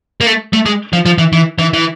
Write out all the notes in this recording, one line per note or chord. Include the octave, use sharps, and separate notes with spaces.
A#3
A3
A3
G#3
F3
F3
E3
E3
E3
E3